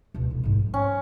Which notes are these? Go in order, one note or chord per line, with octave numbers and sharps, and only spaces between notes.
C#2 B2
D3 D#4
A1 G#2
F3
C#4